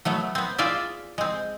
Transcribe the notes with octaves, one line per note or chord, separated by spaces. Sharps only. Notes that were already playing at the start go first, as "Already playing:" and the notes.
F#3 A3 B3
B3 C4
F4 G#4 D5 E5
G#3 C4